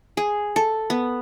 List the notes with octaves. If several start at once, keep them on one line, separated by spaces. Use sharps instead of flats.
G#4
A4
B3